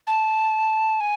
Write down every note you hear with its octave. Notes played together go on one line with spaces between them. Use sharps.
A5
G#5